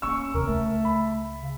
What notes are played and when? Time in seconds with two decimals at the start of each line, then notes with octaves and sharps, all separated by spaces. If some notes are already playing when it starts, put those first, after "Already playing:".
0.02 D#2 A#3 C#4 C#6 E6
0.34 D#2 C3 A#4
0.47 C#2 A3
0.85 B5
1.42 C#3